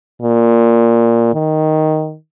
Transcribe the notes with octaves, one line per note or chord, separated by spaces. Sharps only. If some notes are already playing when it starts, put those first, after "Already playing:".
A#2
D#3